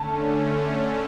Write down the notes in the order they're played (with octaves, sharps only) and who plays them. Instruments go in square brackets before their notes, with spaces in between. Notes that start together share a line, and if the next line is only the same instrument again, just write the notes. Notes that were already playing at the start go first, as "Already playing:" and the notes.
Already playing: [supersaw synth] D3 A3 C#4 [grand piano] A5